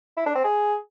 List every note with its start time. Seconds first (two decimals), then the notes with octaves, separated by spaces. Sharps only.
0.17 E4
0.26 D4
0.35 C4
0.44 G#4